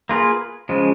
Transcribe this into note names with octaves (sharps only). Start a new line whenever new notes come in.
A#3 F4 G#4 B4
C#3 F3 G#3